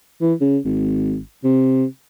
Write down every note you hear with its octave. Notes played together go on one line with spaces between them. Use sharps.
E3
C#3
G#1
C3